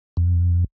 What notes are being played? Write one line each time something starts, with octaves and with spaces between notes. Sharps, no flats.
F2